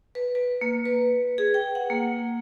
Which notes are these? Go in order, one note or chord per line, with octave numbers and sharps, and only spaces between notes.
B4
B4
A#3
B4
G#4
G5
F#5
A#3